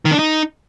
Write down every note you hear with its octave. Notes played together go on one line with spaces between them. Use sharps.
D#3
D4
D#4